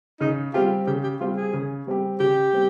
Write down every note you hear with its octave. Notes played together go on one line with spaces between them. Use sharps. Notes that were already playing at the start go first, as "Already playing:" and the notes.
C#3 D#4
G3 C4 F4 G4
C#3 G4
G4
G3 C4 F4 G4
G#4
C#3
G3 C4 G4
C#3 G4
G3 C4